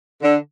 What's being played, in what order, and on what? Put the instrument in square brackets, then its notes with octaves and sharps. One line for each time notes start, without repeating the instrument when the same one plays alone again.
[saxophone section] D3